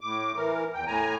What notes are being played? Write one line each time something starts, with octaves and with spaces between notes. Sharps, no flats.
A2 D6
E3 A#4
E2 G5
A2 G#5 A#5